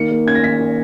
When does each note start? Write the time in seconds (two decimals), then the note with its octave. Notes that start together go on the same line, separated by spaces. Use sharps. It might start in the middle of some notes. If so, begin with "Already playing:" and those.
Already playing: D#3 A#3 C#7
0.11 A#3
0.27 C#4 G#6
0.35 A#6
0.43 D#3 B6
0.59 D#3